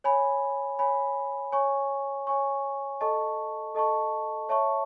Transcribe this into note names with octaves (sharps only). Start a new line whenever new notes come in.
C#5 G#5 B5
C#5 G#5 B5
C#5 G#5 C#6
C#5 G#5 C#6
A4 D#5 A5 C#6
A4 D#5 A5 C#6
C#5 E5 A5 C#6